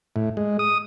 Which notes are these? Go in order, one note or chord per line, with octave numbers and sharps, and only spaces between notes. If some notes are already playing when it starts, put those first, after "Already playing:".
A2
G#3
D#6